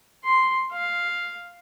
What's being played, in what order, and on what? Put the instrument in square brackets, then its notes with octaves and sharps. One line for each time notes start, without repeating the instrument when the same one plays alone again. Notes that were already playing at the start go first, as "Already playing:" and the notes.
[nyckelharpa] C6
F5